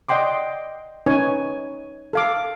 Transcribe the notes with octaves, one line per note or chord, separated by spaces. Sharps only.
D5 D#5 F#5 G5 C6 D6
C#4 D#4 B4 C#5 G#5
A4 F5 D6